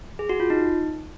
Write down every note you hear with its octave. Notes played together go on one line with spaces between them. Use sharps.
G#4
F#4
F4
D#4